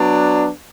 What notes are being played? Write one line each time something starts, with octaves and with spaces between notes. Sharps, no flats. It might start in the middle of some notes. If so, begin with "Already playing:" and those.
Already playing: F#3 B3 D4